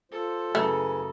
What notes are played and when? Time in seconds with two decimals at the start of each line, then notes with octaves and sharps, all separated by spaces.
0.12 F4 A4 C5
0.55 F#2 C#3 A3 E4 G#4 B4